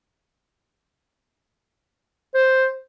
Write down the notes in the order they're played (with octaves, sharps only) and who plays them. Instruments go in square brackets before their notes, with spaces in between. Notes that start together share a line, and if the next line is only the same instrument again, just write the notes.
[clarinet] C5